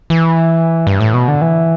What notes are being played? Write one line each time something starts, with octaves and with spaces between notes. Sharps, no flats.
E3
G2
A2
B2
D3
E3